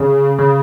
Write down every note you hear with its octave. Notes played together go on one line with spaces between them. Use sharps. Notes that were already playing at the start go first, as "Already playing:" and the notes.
Already playing: C#3
C#3